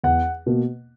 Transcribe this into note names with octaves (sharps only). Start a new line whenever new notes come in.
E2 F#5
B2 A#3